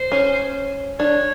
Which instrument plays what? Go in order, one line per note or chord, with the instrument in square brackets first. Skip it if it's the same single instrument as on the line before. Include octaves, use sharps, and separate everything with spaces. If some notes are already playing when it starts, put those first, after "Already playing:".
Already playing: [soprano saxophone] C5
[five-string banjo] C#4
[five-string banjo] D4 [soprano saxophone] C#5